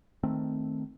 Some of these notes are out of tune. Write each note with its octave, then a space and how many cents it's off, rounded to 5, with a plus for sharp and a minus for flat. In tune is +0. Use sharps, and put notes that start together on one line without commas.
D#3 +0 A3 +0 C4 +0